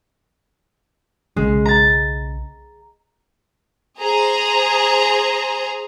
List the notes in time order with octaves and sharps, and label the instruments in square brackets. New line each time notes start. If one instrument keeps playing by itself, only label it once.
[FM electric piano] B1 C#3 [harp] G#3
[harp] A#5 A6
[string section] G#4 C5 A#5